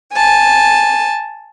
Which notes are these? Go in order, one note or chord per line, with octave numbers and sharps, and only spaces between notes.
G#5 A5